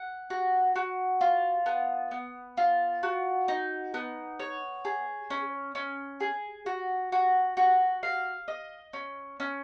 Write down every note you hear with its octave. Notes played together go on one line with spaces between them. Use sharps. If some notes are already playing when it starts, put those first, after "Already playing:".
Already playing: F#5
F#4
F#4
F4
B3
B3
F4
F#4
D#4
B3
C#5
G#4
C#4
C#4
G#4
F#4
F#4
F#4
F5
D#5
C#4
C#4